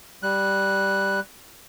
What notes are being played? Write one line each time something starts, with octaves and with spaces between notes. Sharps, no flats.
G3 F#6